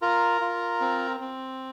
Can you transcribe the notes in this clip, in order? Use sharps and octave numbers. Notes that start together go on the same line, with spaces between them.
F4 A#4 A#5
F4
C4
C4